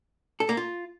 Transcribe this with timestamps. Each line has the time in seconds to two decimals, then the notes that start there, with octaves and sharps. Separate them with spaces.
0.40 A4
0.49 A#3
0.57 F4